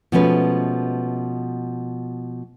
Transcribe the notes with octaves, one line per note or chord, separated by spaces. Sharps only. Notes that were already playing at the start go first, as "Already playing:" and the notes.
B2 F3 G#3 A3 C#4 B4